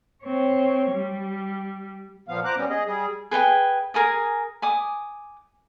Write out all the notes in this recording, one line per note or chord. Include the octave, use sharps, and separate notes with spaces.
C4 C#5
G3
A#2 F3 B3 F5
C5 A#5 D6 F#6
G3 B3 C#4
G#4 D#5
G3 G#4
G#4 B4 G5 G#5
G#4 A#4 G#5 D#6
G#5 D6 D#6